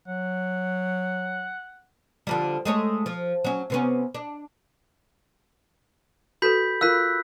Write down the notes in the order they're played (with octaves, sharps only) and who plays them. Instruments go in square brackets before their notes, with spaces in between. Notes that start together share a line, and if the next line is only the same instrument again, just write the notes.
[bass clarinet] F#3 [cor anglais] F#5
[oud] D3 F3 G3
G#3 A3 C#5
F3
F#3 C#4
C3 B3 C#4
D4
[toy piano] F#4 A4 B4 [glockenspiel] B5 G6 B6
[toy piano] F4 A#4 F5 [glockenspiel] E6 F#6 B6